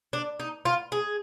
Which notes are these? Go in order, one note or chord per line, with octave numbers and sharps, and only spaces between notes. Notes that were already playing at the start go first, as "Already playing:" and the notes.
D4
D#4
F4
G#4